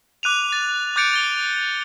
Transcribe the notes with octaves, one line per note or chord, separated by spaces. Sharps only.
D6 F#6 D#7 F7
A6
D6 F#6 G6 A6 C#7 D7
A6 G7